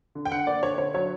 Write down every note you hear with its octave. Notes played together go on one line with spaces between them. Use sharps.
D3
G5
D3 F#5
A#3 D5
D3 C#5
D3 C#5
F#3 C#5